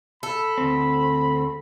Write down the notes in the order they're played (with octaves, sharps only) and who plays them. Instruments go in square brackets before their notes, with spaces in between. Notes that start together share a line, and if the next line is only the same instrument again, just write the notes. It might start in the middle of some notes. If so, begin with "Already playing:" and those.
[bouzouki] A4 [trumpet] B5
[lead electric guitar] D2 C4